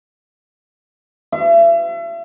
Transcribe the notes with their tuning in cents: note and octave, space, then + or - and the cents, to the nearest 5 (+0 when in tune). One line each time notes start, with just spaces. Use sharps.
E5 +40